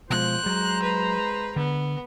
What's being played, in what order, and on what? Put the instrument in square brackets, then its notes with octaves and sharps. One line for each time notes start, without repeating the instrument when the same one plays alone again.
[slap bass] B2 G#3 [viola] F3 [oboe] C5 [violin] F#6
[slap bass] F#3 [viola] G#3 A#5
[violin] B4
[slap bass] D3 [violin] B3